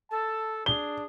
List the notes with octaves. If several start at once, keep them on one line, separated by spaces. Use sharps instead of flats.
A4 A5
D4 G#4 G7